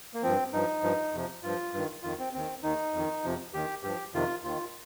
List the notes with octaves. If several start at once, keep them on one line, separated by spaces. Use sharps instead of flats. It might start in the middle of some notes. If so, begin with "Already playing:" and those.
A#3
G2 F3 C4
G2 F3 D#4
G2 F3
F2 C3 F3
G2 F3 F4
G2 D#3
F2 D#3 F4
C4
D#2 D#3 C4
D#2 D#3 D#4
F2 D#3
F2 C3 F3
D#2 D#3 G4
G2 F3 G4
F2 C3 D#3 F4
D#2 D#3 F4